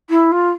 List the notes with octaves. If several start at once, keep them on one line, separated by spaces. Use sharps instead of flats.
E4
F4